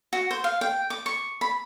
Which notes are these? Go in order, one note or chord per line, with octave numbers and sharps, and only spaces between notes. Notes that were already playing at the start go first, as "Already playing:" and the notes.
F#4
C5
F5
G5
D6
C#6
B5